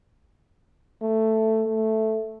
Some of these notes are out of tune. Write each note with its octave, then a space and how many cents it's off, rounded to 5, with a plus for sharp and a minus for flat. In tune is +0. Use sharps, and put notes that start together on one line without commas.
A3 +5
A3 -5